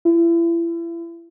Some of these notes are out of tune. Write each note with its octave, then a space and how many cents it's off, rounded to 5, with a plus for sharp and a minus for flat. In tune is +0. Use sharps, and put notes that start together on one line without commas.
E4 +35